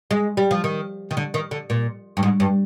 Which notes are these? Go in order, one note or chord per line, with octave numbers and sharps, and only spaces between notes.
G#3
G3
F3
D#3
D#3
D3
D#3
D3
A#2
G2
G#2
G2